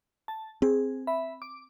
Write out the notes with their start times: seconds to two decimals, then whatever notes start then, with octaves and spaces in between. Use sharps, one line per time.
0.28 A5
0.62 C4 G#4
1.07 E5 B5
1.42 D6